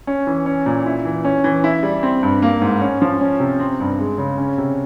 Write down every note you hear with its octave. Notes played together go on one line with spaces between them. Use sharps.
C#4
E3
C#4
A#2
E4
E3
C#4
E3
E4
G3
C4
G2
A#3
G#2
C#4
F3
C#4
C3
C4
G2
G#3
C#3
C#4
C3